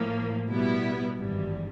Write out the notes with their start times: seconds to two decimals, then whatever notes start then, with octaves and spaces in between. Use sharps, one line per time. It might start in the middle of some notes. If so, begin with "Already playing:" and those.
Already playing: A2 F3 A#3
0.49 B2 G3 B3 E4
1.18 G#1 G2 E3 G3